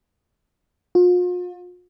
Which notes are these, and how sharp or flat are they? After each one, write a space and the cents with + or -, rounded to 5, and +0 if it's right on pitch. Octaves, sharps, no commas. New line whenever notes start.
F4 +40